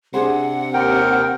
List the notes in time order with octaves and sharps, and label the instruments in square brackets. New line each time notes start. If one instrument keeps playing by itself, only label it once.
[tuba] C3 [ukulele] D4 G#4 C5 [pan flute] F#5
[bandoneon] D#2 A#4 G5